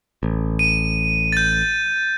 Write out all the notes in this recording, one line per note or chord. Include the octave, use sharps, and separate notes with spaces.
A1
D#7
G6 A6